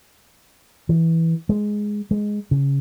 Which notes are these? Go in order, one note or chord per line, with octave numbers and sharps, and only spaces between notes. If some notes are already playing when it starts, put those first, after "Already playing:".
E3
G#3
G#3
C#3